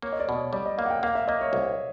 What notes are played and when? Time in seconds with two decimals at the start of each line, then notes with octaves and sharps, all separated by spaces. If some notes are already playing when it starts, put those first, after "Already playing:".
0.02 A#3 C#5
0.13 D#5
0.20 D5
0.28 B2 C#5
0.53 G3 D5
0.66 D#5
0.78 A#3 F5
0.85 F#5
0.90 G5
1.03 A#3 F5
1.15 E5
1.28 A#3 D#5
1.41 C#5
1.53 C2